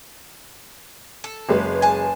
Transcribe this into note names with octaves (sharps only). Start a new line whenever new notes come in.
A4
F#1 G#3 B4
G#5 A5